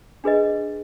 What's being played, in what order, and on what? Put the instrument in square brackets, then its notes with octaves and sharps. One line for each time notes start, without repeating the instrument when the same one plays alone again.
[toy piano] D4 G#4 B4 D#5